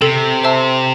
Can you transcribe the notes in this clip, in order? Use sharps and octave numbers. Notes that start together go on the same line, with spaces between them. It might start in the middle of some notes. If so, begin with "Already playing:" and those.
C3 A4
C5 E5 A5 E6